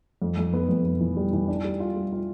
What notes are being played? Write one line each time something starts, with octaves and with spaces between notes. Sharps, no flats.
F2
F2
B3
F2
F2
E3
G3
E3
D4
G3
F4
G3
F4